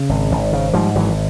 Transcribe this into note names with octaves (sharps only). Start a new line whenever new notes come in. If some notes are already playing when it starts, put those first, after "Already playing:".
Already playing: C#3
G#1
G#1
C#3
G#2 F3 G3
G#1 E3 F#3